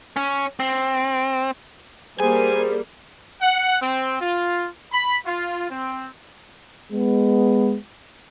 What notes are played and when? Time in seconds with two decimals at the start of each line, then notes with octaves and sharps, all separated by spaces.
0.16 C#4
0.60 C4
2.20 G3 A#3 G#4 C5 G#5
3.41 F#5
3.82 C4
4.22 F4
4.93 B5
5.26 F4
5.71 C4
6.91 G#3 B3